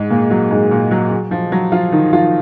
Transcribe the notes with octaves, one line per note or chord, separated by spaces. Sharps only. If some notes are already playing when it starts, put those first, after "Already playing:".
Already playing: G#2 G#3
A#2 A#3
F#3
G#2 G#3
A#2 A#3
F#3
F#3
F3
F#3
F3 F4
D#3 D#4
F3 F4